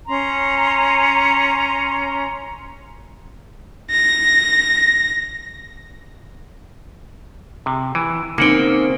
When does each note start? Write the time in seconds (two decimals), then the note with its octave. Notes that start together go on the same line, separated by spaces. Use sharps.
0.08 C#4 A#5 C6
3.91 A#6
7.66 C3
7.95 E3
8.38 C#3 A#3 C4 D#4 F#5 G5